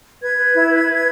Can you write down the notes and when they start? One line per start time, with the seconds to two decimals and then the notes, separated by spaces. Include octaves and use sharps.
0.21 B4 G#6
0.38 B4
0.54 E4
0.70 B4
0.87 B4